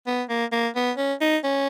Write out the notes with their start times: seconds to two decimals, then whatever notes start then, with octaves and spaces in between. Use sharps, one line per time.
0.07 B3
0.29 A#3
0.52 A#3
0.76 B3
0.98 C#4
1.21 D#4
1.44 C#4